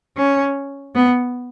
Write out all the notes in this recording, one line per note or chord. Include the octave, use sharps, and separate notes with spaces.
C#4
B3